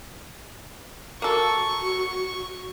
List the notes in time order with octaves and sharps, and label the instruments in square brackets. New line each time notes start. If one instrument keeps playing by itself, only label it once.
[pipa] A#3 A4 [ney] F#4 [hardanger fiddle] C#6